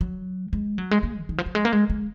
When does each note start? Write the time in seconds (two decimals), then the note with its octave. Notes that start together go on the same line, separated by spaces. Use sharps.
0.01 F#3
0.53 G#3
0.78 F#3
0.91 G#3
1.03 A#3
1.20 D3
1.29 D#3
1.38 F3
1.46 F#3
1.55 G#3
1.65 A#3
1.73 G#3
1.90 G#3